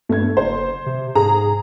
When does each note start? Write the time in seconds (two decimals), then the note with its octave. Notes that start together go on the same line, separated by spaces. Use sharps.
0.09 G2 A3 G#6
0.37 F#1 C5
0.86 C3
1.15 G#2 G#4 A#5